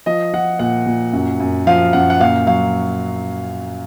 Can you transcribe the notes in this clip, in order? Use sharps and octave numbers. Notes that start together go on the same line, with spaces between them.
F3 D#5
F3 F#5
A#2 F#5
A#2
F#2
F#2
F3 F5
F#2 F#5
F#5
A#2 F5
F#3 F5